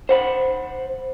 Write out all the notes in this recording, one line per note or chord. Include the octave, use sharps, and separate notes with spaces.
C5 F#5 B5